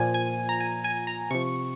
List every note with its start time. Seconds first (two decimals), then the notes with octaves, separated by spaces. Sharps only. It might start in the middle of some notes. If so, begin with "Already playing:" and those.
Already playing: A#2 F3 G#5
0.14 G#5
0.49 A#5
0.60 G#5
0.84 G#5
1.07 A#5
1.30 C3 F3 C#6